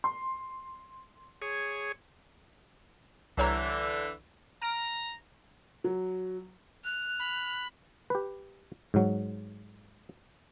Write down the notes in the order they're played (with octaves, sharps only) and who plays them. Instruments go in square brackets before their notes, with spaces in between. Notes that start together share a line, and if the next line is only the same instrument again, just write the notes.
[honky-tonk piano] C6
[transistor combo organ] G#4 C#5
[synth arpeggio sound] C2 C#5 A#5 [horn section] D3 E3
[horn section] A#5 [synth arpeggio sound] F6 D7
[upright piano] F#3
[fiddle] F6 [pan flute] F#6
[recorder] B5
[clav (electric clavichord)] G4 B4
G#2 F#3